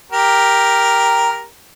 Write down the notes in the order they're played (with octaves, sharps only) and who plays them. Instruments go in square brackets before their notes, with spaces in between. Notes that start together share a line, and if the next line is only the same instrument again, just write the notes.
[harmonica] G4 A#4